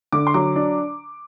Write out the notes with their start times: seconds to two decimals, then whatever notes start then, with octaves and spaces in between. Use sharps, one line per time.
0.12 D3 D6
0.27 C6
0.34 F#3 D6
0.56 D4